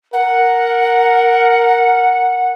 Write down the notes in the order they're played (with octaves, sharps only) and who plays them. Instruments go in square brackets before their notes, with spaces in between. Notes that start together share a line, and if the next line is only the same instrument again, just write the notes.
[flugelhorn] A#4 [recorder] F#5